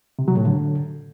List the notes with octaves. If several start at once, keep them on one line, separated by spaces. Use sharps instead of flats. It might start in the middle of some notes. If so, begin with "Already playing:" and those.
C3
F#3
A2
D3